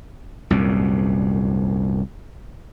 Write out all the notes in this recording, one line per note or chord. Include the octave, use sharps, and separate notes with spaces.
C2 F#2 A#2